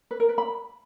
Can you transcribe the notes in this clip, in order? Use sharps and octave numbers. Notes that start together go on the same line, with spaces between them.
B4
A#4
B4
B5